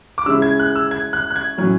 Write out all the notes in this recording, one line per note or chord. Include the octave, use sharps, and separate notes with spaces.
D6
C#3 G#3 C#4 E4 E6
G#6
F#6
E6
G#6
F#6
F#6
G#6
A2 F#3 C#4